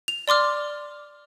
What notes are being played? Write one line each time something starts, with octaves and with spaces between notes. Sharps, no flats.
F7
D5 C6 D6 F6